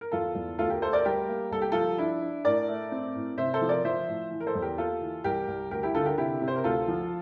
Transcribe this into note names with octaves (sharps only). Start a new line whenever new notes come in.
A#4
E2 F4 A4
E2
D2 F4 A4
G4 A#4
A3 A4 C5
A#4 D5
G3 G4 A#4
A#3
C2 A4
G4
F3 F4 A4
D4 E4
D4
A2 A#4 D5
A3
C4
A2
C3 C5 E5
A4 C5
F3
A#4 D5
F3 C5 E5
A2
E3
A#4
A4 C5
E2
G4 A#4
A#3 F4 A4
E3
C2 G4 A#4
C2
D2 G4 A#4
E4 G4
D3 F4 A4
G4 A#4
C3 E4 G4
C3
C5
A#4
D2 F4 A4
F3